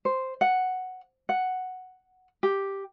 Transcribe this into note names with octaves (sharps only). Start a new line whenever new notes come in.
C5
F#5
F#5
G4